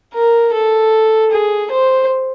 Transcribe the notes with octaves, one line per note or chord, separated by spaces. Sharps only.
A#4
A4
G#4
C5